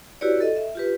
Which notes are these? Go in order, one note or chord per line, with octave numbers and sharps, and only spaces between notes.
E4 F#4 G4 B4 C#5 D5
A4 D#5
E5
F4 G4 B4